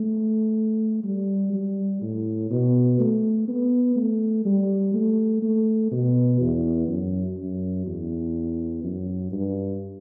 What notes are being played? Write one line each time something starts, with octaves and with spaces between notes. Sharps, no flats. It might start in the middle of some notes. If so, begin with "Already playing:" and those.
Already playing: A3
G3
G3
A2
B2
A3
B3
A3
G3
A3
A3
B2
E2
F#2
F#2
E2
F#2
G2